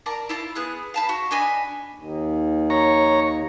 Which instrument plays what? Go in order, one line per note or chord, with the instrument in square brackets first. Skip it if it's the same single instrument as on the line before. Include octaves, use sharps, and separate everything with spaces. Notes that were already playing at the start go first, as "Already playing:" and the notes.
[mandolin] A#4 D5 A5 A#5
E4 F4 A5
B3 G#4 F#6
F5 A5 B5
F#4
D4 D#5 G#5 B5
[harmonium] D#2
[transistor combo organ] C#5 A#5